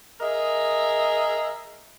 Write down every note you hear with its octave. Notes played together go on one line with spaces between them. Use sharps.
G#4 A#4 D#5 E5